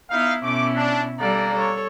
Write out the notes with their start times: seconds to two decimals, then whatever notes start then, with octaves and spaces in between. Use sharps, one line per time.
0.10 B3 D#4 E4 F5
0.43 B2 A3 C#4 E4 D6
0.76 D4
1.19 G3 A#3 D4 A4 D5 A#5
1.54 A4 C#5